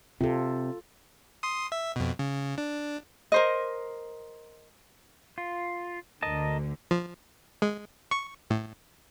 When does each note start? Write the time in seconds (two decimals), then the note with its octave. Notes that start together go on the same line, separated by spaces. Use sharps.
0.21 C3 F4 A4
1.43 C6 D#6
1.72 E5
1.96 F2 B2
2.19 C#3
2.58 D4
3.32 A#4 C5 D#5
5.38 F4
6.22 D2 D3 A#4 D#5 A5
6.91 F3
7.62 G#3
8.11 C#6
8.50 A2